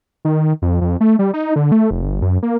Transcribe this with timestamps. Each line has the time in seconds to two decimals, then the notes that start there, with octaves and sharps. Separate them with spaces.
0.25 D#3
0.62 F2
0.81 F2
1.01 A3
1.19 G3
1.34 D#4
1.56 D3
1.72 A3
1.91 F1
2.03 G1
2.22 F#2
2.42 A#3